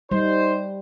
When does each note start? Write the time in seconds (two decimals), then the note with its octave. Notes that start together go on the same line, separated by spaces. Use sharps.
0.11 G3 D#4 C5